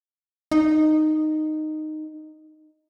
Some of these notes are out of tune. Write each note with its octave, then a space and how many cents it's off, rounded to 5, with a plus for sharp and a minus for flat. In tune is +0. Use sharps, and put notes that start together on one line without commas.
D#4 -10